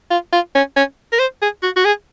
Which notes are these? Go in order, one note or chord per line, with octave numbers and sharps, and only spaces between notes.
F4
F4
C#4
C#4
A#4
C5
G#4
F#4
F#4
G#4